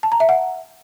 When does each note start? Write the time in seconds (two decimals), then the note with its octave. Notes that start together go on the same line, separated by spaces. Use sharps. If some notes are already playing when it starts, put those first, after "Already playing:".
0.03 A5
0.12 A#5
0.20 E5
0.29 F#5